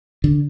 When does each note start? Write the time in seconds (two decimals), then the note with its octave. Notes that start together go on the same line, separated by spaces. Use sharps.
0.24 D3